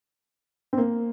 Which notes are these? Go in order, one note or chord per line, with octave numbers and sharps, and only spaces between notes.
C4
A#3